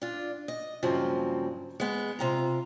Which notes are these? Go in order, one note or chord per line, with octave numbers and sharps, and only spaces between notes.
D4 F4
D#5
G2 C#3 F3 F#3 A#3 C4
G#3 B3
C3 F4 A#5